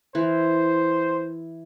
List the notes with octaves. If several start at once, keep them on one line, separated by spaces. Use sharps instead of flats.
E3 C5